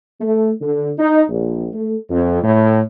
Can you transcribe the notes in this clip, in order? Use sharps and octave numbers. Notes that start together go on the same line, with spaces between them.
A3
D3
D#4
A#1
A3
F2
A2